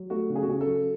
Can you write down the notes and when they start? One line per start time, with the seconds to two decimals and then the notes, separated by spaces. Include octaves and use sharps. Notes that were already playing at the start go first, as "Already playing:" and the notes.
Already playing: F#3
0.10 A3 F#4
0.30 C#3
0.36 G#4
0.43 F#4
0.48 C#3 G#4
0.61 A4
0.66 F#3